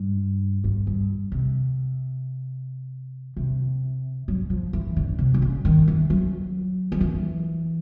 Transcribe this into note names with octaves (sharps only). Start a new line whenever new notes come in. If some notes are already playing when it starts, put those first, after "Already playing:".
Already playing: G2
G2
G2
C3
C3
F#3
F3
E3
D3
C3
D3
C#3
D#3
E3
F#3
F3
E3